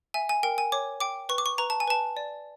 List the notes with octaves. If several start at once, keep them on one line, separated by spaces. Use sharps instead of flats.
E5 G#5
G#5
A#4 G5
G#5
C#5 D6
G5 D6
B4 C#6
D6
C#6
B4 A#5
A5
G#5
B4 A5
D5